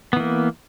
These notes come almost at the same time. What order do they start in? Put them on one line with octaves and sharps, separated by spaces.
B3 E3 A#3